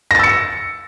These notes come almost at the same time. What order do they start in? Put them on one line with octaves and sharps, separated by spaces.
A#6 A6 E6 C#7